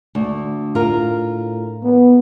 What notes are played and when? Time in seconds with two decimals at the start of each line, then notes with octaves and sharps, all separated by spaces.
0.15 D2
0.75 A2 F4 A#4
1.83 B3